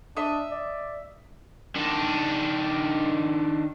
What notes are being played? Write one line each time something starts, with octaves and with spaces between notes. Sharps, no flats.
D4 D#5 E5
D5
D#3 D4